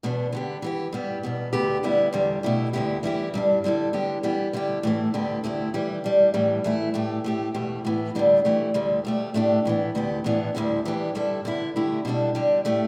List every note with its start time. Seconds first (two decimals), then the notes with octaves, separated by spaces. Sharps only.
0.03 E2 B2 B3 D4
0.33 D3 B3 G4
0.62 E3 B3 G4
0.93 G2 G3 B3 G4
1.23 E2 B2 B3
1.53 D2 D3 B3 G4
1.83 D2 D3 G3 B3 E4
2.13 E2 D3 G3
2.43 B2 A3 E4 G4
2.73 D2 D3 B3 E4 G4
3.03 E3 G3 E4 G4
3.34 G2 G3 D4
3.64 D3 G3 E4 A4
3.93 D3 B3 D4 G4
4.23 E3 G3 B3 G4
4.53 D3 G3 E4 G4
4.83 A2 E3 A3
5.14 D2 D3 B3 G4
5.44 D2 D3 A3 E4 G4
5.74 E3 G3 E4 G4
6.04 G2 G3 D4
6.34 A2 E3 G3
6.64 E3 A3 E4
6.94 A2 A3 G4
7.24 A2 A3 G4
7.54 E2 B2 A3 G4
7.85 A2 E3 B3
8.15 D2 D3 G3 B3 D4
8.45 E3 A3 G4
8.74 D2 D3 G3
9.05 B2 A3 G4
9.34 A2 A3 D4 G4
9.65 A2 E3 B3
9.95 D2 D3 B3 G4
10.24 A2 E3 B3 D4
10.55 D2 D3 G3 E4
10.85 E3 B3 D4 G4
11.15 G2 D3 G3 E4 A4
11.45 D3 B3 E4
11.76 D3 A3 E4 G4
12.05 B2 G3 D4 A4
12.35 D3 G3 D4 G4
12.65 A2 A3 G4